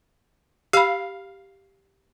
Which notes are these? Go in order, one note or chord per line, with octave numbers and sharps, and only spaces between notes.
G4 F5 B5